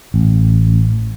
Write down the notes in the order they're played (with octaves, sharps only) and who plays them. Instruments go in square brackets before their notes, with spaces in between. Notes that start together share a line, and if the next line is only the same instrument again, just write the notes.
[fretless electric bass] A1